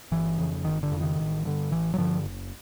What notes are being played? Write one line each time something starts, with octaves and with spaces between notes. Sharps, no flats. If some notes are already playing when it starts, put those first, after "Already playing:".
G1 E3
F2 C#3
G1 D#3
D3
F2 C#3
D#3
A1
G2 D3
A1 E3
F#3
G2 D3 F3
F#1